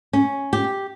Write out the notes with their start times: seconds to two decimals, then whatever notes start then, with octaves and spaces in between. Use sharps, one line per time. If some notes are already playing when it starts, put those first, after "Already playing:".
0.13 C#4
0.53 G4